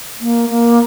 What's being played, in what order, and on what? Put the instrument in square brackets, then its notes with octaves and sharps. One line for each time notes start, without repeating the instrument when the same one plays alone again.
[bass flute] A#3
A#3